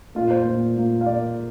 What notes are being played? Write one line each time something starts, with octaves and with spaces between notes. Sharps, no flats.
A#2 A#3 F4
C5
A#2 A#3
A#2 A#3
F5
A#2 A#3 D5